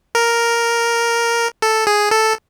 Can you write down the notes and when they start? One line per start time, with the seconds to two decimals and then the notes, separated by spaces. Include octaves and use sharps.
0.15 A#4
1.62 A4
1.87 G#4
2.11 A4